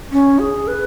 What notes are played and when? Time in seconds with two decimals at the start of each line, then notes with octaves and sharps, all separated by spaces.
0.12 C#4
0.39 G#4
0.67 B4